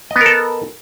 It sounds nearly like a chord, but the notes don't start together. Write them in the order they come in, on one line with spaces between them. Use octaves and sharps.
D#5 B3 A#4 A4